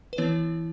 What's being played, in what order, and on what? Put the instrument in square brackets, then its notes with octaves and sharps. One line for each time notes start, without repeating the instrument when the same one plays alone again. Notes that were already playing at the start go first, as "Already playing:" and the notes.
[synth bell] B4
E3 B3 E4 C#5